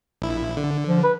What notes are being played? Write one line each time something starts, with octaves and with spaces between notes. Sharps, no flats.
A#1 E4
D3
F3
B4